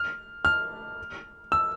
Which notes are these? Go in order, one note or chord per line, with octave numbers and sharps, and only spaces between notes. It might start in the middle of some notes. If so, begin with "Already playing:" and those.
Already playing: F6
F6
E6